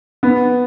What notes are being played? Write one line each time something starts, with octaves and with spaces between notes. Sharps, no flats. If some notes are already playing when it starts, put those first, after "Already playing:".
B3